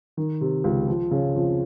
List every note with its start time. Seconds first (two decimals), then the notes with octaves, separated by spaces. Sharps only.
0.17 D#3
0.41 C3
0.64 C#2
0.87 F3
1.11 C#3
1.35 F2